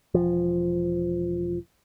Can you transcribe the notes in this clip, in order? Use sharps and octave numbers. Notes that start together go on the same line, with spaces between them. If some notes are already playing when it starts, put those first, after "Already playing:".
E1 F3